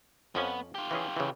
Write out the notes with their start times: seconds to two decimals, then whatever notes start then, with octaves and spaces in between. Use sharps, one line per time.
0.35 F2 F3 B3 C#4
0.75 F4 G4
0.91 E3 C#4 G#4
1.17 C#3 E3